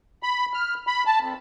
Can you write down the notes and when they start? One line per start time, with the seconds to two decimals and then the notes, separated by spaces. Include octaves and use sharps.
0.23 B5
0.54 F6
0.87 B5
1.06 A5
1.20 F2